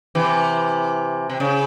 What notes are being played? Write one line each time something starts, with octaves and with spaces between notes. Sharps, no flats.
C3 E3
C3
C#3